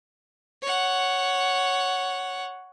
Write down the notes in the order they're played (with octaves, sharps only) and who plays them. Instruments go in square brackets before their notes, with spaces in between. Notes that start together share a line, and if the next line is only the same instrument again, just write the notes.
[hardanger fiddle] C#5 F#5